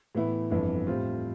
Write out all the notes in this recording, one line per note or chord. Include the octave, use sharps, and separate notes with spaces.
A2 E3 B3 E4
G1 F2 E3 B3 D4
A2 G3 C4 F4